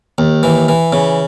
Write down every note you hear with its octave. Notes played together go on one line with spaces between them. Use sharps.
D#2
E3
E3
C#3